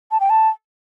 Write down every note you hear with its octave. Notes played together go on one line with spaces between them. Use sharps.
A5
G5
A5